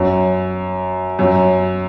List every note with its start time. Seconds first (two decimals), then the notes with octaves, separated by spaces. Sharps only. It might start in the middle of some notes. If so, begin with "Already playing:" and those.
Already playing: F#2
1.19 F#2